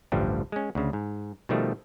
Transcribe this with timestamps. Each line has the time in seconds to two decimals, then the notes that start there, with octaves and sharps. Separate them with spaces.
0.12 A1 D2 G2 D3 F3 G3
0.52 G#3 C#4
0.75 D2 C#3
0.93 G#2
1.49 B2 D#3 F3 G3 A3